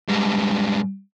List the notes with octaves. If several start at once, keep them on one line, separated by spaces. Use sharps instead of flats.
G#2 G3